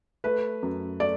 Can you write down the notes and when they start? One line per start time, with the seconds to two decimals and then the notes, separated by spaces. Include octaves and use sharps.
0.24 A3 B4
0.63 F#2
1.00 A3 D5